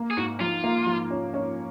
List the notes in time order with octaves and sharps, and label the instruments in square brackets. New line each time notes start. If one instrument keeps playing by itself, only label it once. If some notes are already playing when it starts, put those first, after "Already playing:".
Already playing: [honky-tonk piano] A#3
[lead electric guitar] G#4
[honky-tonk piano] G#2 [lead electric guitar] F#4
[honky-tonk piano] F3 [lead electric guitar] F4
[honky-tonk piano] A#3
F3
C#4
C#4